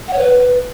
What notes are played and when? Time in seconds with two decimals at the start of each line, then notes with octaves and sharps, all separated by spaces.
0.08 F#5
0.13 C#5
0.19 B4